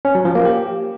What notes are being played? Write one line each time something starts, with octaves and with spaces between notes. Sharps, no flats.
C#4
F#3
F3
A#3
G4